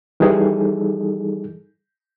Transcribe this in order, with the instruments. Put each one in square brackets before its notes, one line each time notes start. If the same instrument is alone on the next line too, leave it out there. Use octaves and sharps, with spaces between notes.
[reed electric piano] E3 G3 D#4 G#4 A4